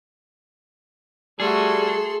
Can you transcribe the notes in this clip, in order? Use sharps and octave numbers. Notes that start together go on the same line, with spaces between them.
G3 A3 F#4 G#4 A4 C6